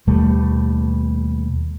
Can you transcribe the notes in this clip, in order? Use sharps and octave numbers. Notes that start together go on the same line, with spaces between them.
D#2 B2 G3 A3